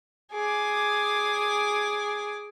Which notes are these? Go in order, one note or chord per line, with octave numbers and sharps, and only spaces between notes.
G#4 D6